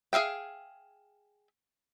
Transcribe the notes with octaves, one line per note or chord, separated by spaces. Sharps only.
G#4 E5 F5 G5